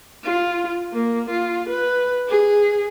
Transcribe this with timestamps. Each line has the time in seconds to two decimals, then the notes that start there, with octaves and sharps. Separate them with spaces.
0.24 F4
0.94 A#3
1.30 F4
1.69 B4
2.29 G#4